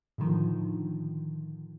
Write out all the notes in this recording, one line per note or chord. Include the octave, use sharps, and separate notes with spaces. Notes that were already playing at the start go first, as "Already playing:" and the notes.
A2 D3 D#3 F3